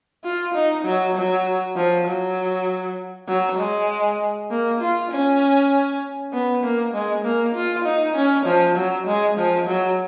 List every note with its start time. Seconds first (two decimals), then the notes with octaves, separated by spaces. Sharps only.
0.24 F4
0.54 D#4
0.85 F#3
1.16 F#3
1.76 F3
2.07 F#3
3.28 F#3
3.59 G#3
4.50 A#3
4.80 F4
5.11 C#4
6.33 B3
6.64 A#3
6.94 G#3
7.25 A#3
7.55 F4
7.85 D#4
8.15 C#4
8.46 F3
8.76 F#3
9.07 G#3
9.37 F3
9.67 F#3